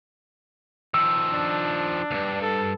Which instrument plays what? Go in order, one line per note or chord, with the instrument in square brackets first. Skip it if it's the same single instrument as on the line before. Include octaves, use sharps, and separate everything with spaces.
[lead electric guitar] D#3 F3 [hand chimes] E6
[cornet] D4
[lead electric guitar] C#2 G2
[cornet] A4